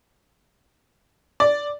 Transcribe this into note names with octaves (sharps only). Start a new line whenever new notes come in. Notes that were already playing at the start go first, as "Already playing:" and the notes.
D5